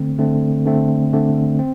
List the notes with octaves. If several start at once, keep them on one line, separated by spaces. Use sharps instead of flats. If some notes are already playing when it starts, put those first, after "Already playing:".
Already playing: D3 A3 C4
D3 A3 C4
D3 A3 C4
D3 A3 C4
C4